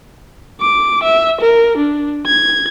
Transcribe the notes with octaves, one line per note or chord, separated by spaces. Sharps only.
D6
E5
A#4
D4
G#6